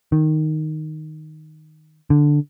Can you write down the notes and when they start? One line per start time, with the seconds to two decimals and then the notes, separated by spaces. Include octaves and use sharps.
0.12 D#3
2.10 D3